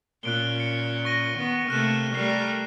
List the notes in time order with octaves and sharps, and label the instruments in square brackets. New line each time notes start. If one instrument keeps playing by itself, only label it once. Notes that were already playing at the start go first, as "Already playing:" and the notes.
[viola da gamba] A#2 C#4 [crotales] F#6 D7 G7
[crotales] C#7
C#6 A#6 D#7
[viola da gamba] D#3 B3
[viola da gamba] C3 A3 A#3 [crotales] F6 F#6 E7
[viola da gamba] G3 A3 A#4 [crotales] C7